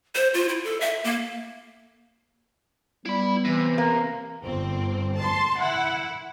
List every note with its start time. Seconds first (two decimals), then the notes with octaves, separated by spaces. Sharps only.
0.15 C5
0.34 F4
0.49 E4
0.64 A4
0.80 E5
1.04 A#3
3.06 G3 B3 E4 B5
3.45 C3 E3
3.78 A#3
4.42 G1 C4
5.18 A5 C6
5.60 E4 F#5